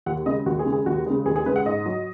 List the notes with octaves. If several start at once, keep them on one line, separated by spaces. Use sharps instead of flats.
D#2 F#5
C#3 G#3 D#5
D#2 F#4
G#4
C#3 G#3
G#4
D#2 F#4
C#3 G#3
D#2 G#4
G#4
C#3 G#3 B4
F#5
G#2 D#5
F#3